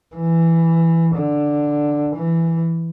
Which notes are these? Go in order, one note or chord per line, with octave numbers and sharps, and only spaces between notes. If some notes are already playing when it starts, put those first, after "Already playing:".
E3
D3
E3